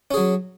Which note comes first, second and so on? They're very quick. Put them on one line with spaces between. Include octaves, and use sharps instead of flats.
C#4 G#4 F#3